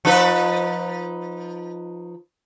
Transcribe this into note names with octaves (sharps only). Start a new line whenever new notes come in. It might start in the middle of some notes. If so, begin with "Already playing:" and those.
F3 D#4 B4